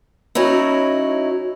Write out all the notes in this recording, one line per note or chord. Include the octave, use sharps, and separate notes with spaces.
F#3 C#4 D#4 E4